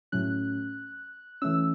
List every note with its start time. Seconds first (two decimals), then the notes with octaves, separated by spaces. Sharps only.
0.12 A2 F#3 A3 C#4 F#6
1.42 E3 A3 C#4 E6